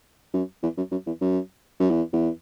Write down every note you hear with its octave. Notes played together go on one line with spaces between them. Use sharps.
F#2
E2
F#2
F#2
E2
F#2
F#2
E2
E2